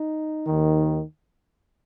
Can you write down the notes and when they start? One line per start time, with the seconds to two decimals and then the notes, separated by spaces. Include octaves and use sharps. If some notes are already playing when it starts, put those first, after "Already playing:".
Already playing: D#4
0.46 D#2 D#3